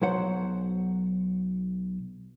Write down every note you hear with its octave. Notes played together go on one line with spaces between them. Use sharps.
B1 F#3 C5 F#5